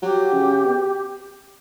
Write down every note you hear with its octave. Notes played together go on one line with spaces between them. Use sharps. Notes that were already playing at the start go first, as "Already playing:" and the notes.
F#3 G4
C#3
B2